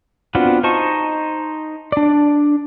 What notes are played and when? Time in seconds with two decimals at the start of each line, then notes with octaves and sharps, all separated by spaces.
0.35 B3 C4 D4 F4 F#4
0.64 D#4 C5 D#5 A5 C#6
1.92 D4 D5